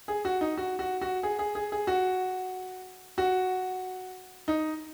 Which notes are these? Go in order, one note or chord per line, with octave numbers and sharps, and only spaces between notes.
G#4
F#4
D#4
F#4
F#4
F#4
G#4
G#4
G#4
G#4
F#4
F#4
D#4